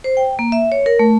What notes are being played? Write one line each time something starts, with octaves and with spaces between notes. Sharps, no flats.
C5
G5
A#3
E5
C#5
A#4
A3